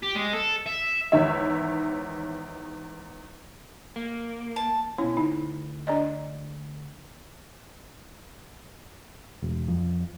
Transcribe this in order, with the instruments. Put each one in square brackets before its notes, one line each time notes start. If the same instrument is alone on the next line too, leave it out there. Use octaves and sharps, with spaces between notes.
[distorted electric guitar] G4
G#3
A4
E5
[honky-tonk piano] E2 G#2 D#3 C#5 E5
[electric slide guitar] A#3
[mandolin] A5
[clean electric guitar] B2 C#4 [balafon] E4
[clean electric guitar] D2 [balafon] D#4
[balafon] D4 D5 D#5
[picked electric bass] E1
F2